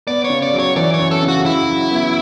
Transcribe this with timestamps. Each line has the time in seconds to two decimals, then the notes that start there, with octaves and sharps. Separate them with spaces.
0.07 B3 D5
0.24 C#5
0.30 C#3
0.42 D5
0.53 F#3
0.59 C#5
0.76 E3 D5
0.94 C#5
0.99 F#2
1.11 A4
1.23 C#3
1.28 F#4
1.46 E4 F#4
1.69 F#3
1.91 B3